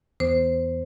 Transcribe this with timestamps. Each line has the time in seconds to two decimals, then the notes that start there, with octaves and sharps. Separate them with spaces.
0.20 E2 C5